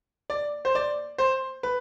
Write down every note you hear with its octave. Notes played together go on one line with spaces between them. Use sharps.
D5
C5
D5
C5
B4